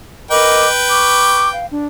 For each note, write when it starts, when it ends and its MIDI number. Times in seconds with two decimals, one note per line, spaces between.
0.31 0.67 70
0.31 1.71 71
0.31 0.67 75
0.31 1.71 79
0.31 0.67 86
0.90 1.49 85
0.90 1.49 86
1.53 1.66 77
1.69 1.86 62